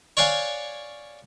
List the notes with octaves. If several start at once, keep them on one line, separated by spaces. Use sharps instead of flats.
C#5 D5 F5 F#5 G#5